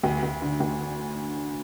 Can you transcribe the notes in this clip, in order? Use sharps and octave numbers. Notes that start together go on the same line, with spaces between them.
D2
D2
D3
D2